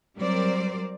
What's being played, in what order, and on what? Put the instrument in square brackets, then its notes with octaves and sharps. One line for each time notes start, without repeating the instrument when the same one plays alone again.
[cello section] F#3 G3 C4 A#4 C5 D5